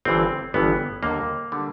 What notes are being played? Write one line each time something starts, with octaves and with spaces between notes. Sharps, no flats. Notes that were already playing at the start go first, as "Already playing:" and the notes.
G1 G2 E3 C4
G1 G2 E3 B3
D#2 D3 G3 A#3
D3 G3